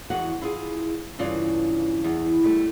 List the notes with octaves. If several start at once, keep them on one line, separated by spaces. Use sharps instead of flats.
E2 F#4 F#5
E4 F4 G#4
G2 C#3 E3 F4 D5
E2
G3 A3